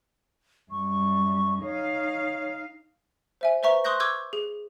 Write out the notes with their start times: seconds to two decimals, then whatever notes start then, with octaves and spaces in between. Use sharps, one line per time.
0.71 F#2 G3 C#6
1.63 D#4 C#5 F5
3.41 C5 E5 G#5
3.63 B4 C5 E5 A#5 C#6
3.84 C6 C#6 D#6 F#6 G6 A#6
4.00 C#6 D6 E6 G6 G#6
4.33 G#4